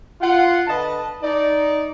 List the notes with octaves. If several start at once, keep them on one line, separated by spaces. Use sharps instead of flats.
F4 F#5
D3 B4 D#5 A5
D#4 D5